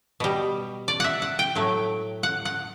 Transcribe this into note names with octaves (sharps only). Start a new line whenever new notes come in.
B2 G3
D5
E5 F#5
F#5
G5
A2 F#3 A3
F#5
F#5